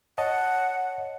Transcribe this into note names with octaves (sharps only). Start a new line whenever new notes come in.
C#5 D#5 F#5 A5